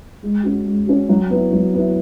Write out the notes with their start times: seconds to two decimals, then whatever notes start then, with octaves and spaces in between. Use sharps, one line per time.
0.23 G#3
0.43 C#4 F#4
0.65 G#3
0.87 C#4 F#4
1.09 F#3
1.30 B3 E4
1.52 F#3
1.74 B3 E4